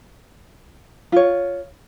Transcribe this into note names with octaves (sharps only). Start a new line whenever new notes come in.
F4 C#5